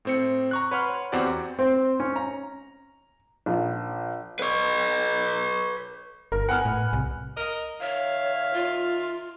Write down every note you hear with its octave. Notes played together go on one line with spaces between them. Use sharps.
A2 C4 C#7
A#5 C#6 F#6
B4 C#5 F#5 B5 C6 F6
E2 C4 F#4 G4 D5
C4
C#4
A#5
A#1
B4 C#5
G1 A#4
B4 F#5 G#5 F6
A2
C2
A#4 D#5
D#3 C#5 E5 F5
F4